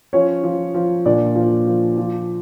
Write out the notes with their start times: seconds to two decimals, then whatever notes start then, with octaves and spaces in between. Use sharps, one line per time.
0.13 F3 C#4 C#5
0.44 F3
0.74 F3
1.06 A#2 D4 D5
1.35 F3
1.67 F3
1.97 F3